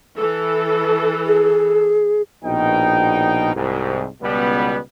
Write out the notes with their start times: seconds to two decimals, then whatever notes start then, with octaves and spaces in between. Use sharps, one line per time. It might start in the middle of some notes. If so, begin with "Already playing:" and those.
0.18 E3 A4
1.26 G#4
2.44 A#1 B2 D#4 G5
3.54 C2 G#2
4.22 C#2 B2 G3 B3